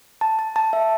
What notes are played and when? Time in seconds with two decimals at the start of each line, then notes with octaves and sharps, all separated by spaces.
0.21 A5
0.39 A5
0.56 A5
0.73 E5